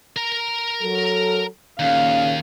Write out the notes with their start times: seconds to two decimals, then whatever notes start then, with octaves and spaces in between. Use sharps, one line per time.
0.16 A#4 A#5
0.81 F#3 A4
1.80 D#2 A#2 C#3 C#4 F5